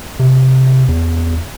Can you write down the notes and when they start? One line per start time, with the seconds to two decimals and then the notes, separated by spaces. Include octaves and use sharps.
0.19 C3
0.88 E2